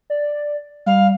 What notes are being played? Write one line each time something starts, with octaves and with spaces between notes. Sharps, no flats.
D5
G3 F5